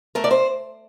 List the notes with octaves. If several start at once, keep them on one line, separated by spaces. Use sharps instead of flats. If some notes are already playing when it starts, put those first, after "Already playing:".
A3 A#4
D5
C5